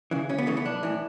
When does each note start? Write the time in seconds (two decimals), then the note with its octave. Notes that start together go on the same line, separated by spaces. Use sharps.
0.11 C#3 E3
0.29 D2 C#4
0.38 B3
0.47 C#3 E3 A3
0.57 B3
0.65 B1 D4
0.83 A2 E3